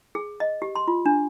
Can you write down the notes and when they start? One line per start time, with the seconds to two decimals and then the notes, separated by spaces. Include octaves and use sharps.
0.15 G#4
0.40 D#5
0.62 G4
0.75 C6
0.88 F4
1.06 D4